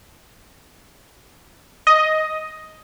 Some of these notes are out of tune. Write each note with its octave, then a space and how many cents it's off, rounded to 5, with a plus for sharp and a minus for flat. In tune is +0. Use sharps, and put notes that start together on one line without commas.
D#5 +5